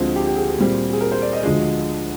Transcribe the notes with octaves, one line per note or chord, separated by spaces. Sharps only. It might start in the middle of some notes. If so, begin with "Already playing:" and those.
Already playing: D2 D3 F3 G#3 C4
G4
G4
G#4
A#2 G3 C4
G#4
A#4
C5
D5
D#5
D2 D3 F3 G#3